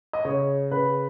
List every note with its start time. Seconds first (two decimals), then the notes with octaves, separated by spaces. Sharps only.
0.13 D#5
0.25 C#3 C#5
0.71 C#3 B4